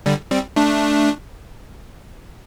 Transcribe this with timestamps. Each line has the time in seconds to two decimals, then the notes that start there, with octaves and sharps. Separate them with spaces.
0.06 D3 G3
0.31 G3 C4
0.56 A3 D4